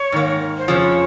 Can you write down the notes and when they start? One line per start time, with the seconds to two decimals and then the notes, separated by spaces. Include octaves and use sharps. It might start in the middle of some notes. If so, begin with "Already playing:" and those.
Already playing: C#5
0.12 G#2 D#3 A#3
0.57 C5
0.68 F2 C#3 F3 C#5